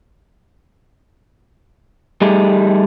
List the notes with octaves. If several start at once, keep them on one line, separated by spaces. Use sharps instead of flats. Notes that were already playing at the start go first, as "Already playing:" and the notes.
G3 A3 D#4 G4 G#4